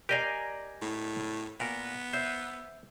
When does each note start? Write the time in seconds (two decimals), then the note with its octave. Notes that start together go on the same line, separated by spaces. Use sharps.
0.09 G4 A#4 D5 D#5 F5 G#5
0.82 A2
1.60 A#2 B3 A#4
2.13 C5 E5